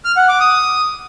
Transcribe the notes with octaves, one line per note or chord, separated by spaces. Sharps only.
F6
F#5
D6
D#6